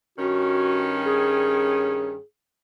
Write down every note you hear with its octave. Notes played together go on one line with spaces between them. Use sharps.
G2 D#3 C#4 F#4
G#4